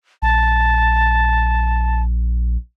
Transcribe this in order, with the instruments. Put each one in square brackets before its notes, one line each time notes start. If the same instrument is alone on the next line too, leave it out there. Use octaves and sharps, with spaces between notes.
[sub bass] A#1 [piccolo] A5